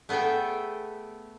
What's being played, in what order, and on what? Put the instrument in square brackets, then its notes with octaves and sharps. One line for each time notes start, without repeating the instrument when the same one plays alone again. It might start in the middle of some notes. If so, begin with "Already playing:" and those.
[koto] A3 B3 G#4 A4 G5